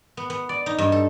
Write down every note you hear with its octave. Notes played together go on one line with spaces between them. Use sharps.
B3
B3
D5
D#4
G2
A4